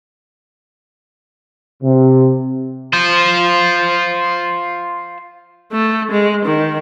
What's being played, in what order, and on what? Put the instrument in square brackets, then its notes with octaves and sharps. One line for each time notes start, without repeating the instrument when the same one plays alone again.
[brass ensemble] C3
[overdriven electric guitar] F4 C5
[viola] A3
G#3
D#3